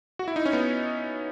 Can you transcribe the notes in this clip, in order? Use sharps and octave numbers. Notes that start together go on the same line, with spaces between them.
F#4
E4
D#4
C#4
B3